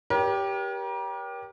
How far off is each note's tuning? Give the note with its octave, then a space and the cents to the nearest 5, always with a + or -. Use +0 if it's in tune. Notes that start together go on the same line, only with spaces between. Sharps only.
G4 +0 A#4 +40 C#5 +25